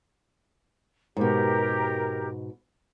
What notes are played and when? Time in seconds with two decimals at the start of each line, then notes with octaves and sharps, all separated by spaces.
1.17 G#2 B2 G4 A#4